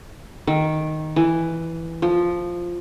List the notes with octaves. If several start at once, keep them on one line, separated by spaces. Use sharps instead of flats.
D#3
E3
F3